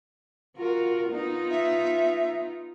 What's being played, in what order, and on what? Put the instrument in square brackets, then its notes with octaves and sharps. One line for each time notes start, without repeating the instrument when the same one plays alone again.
[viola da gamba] F4 F#4 A#4
B3 D#4 F4
[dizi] E5